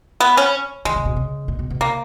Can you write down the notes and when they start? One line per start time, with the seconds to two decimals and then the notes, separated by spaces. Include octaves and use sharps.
0.20 B3
0.37 C#4
0.85 D#3 G#3
0.96 C#3
1.05 B2
1.16 C#3
1.48 A#2
1.59 B2
1.70 B2
1.80 C#3 A#3